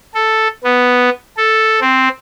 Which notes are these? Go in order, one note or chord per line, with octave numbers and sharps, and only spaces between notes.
A4
B3
A4
C4